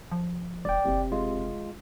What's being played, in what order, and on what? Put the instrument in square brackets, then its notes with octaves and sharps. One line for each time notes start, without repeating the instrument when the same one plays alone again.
[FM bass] F3
[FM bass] E1 [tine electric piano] D5 G5
[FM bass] F#1 [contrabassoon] C3
[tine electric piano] G#3 F4